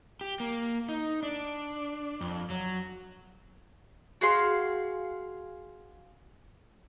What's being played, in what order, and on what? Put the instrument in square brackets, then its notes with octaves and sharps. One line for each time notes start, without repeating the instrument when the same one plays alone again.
[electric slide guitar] G4
A#3
D#4
D4
F2
F#3
[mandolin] F#4 G#4 F5 C6